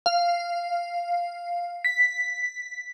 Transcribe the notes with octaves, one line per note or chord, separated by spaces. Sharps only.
F5
B6